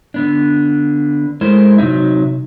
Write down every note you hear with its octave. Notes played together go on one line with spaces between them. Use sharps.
D3 B3 D4
G#3 A3 E4 A#4 C5
C3 F#3 G#3 D#4 E5